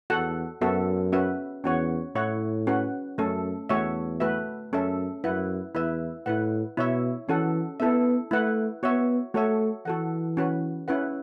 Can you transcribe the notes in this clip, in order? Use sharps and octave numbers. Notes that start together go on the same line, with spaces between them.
E2 F#4 A4 F#5
F#2 B3 F#4 A4 E5
C#4 F#4 B4 E5
E2 C#4 F#4 C#5 F#5
A2 E4 C#5 F#5
C#4 F#4 B4 F#5
F#2 A3 C#4 A4
E2 A3 F#4 C#5 E5
A3 F#4 B4 E5
F#2 C#4 A4 E5
F#2 E4 B4 F#5
E2 E4 B4 E5
A2 E4 B4 F#5
B2 E4 C#5 E5
E3 C#4 F#4 A4 F#5
B3 E4 A4 E5
A3 E4 B4 F#5
B3 F#4 C#5 E5
A3 F#4 A4 C#5 E5
E3 F#4 A4 F#5
C#4 F#4 B4
C#4 E4 B4 F#5